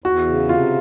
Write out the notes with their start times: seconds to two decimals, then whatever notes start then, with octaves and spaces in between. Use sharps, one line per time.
0.04 E2 F#4
0.27 C#3
0.49 C3 F4